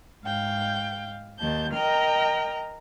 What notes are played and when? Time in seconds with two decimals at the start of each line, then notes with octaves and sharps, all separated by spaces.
0.25 G#2 F5 G5 G6
1.39 D#2 D#3 A5 G6
1.73 A#4 D#5 G5 A#5 F6